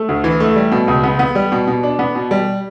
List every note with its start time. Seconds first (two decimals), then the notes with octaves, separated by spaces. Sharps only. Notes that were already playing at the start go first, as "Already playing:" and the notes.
Already playing: A3
0.09 D2
0.24 E3
0.40 A3
0.56 G3
0.72 B2
0.88 C#2
1.03 B3
1.19 B3
1.35 G3
1.52 B2
1.67 B2
1.83 D4
1.99 B3
2.15 B2
2.31 G3